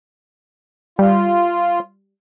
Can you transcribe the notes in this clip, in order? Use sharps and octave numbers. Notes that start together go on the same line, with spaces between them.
G3 F4